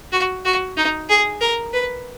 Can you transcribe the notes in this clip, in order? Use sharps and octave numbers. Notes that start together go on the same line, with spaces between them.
F#4
F#4
D#4
G#4
A#4
B4